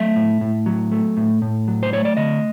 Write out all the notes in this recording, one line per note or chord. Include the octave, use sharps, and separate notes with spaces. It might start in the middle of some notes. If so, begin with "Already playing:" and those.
Already playing: F#3 A3 E5
A2
A2
F#3
A3
A2
A2
F#3
C5
A3 C#5
D5
D3 D#5